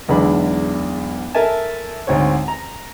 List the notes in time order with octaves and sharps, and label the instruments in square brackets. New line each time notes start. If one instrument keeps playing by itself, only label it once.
[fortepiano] B1 E2 D3 G#3 D4 B5
A4 A#4 E5 G#5 A5
D2 G#2 C4 C#5
A#5